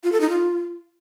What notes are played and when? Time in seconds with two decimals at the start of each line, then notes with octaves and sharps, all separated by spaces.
0.03 F4
0.12 A4
0.20 D#4
0.29 F4